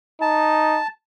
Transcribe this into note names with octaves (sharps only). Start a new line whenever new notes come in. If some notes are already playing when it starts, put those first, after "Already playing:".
D#4 A5